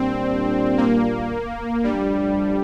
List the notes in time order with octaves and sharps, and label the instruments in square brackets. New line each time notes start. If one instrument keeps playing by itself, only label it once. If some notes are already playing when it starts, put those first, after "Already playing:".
Already playing: [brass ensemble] A#2 G3 D4 [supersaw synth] C4
[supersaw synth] A#3
[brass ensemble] G2 F3 A3 D4 [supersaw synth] G3